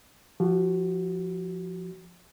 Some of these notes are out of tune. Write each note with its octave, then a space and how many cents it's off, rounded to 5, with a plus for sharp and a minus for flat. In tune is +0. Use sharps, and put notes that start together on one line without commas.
F3 +0 F#4 +30